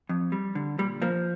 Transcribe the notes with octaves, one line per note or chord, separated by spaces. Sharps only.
F2
G3
D3
A#2 G3
F3 A#3